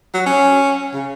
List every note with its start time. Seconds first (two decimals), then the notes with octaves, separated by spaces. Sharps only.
0.14 F#3
0.26 C#4
0.93 C#3